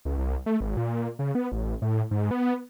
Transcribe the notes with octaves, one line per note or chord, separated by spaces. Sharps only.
C#2
C2
A3
G#1
A#2
C#3
B3
A1
A2
G#2
B3